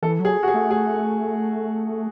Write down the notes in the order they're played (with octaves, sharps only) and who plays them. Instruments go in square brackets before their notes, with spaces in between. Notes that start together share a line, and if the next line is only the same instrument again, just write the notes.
[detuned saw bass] E3 [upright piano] A4
[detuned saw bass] F#3
[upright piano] G#4
F#4
G#4
[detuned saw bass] A3
[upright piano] G#4